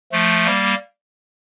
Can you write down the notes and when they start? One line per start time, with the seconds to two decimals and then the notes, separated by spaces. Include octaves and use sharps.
0.12 F3 A3
0.46 G3 A#3